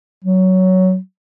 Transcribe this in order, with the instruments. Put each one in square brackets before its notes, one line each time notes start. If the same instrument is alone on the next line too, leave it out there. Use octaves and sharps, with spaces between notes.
[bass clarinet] F#3